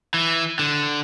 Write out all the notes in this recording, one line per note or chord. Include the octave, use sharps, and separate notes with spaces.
E3
D3